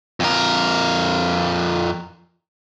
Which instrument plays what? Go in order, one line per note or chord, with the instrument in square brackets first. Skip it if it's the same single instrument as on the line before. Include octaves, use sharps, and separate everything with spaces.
[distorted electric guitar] F2 A#4